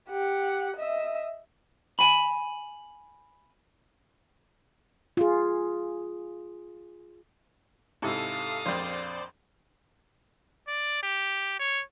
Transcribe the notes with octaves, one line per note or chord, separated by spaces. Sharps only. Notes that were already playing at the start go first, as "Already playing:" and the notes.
G4 F#5
D#5 E5
G#5 B5
F4 G#4
G#2 C3 E4 A4 F5 D#6
A#1 F2 C5 D5
D5
G4
C#5